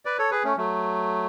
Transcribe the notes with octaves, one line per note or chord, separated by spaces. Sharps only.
B4 D5
A4 C#5
G#4 B4
A3 C#4
F#3 A3